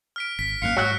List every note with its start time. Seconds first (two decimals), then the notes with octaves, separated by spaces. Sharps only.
0.16 F6 B6 D7
0.39 G#1 B6
0.62 G#1 F#2 A#3 F5 F#6 C#7
0.77 G#2 F#3 F#4 F#5 F6 C#7